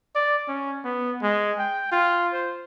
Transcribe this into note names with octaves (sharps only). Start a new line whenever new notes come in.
D5
C#4
B3
G#3
G5
F4
C5